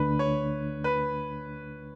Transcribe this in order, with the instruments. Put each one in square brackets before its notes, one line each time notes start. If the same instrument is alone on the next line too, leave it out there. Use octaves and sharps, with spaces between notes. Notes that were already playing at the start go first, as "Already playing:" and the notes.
Already playing: [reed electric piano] D2 D3 A3 D4 [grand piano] B4
[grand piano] C#5
B4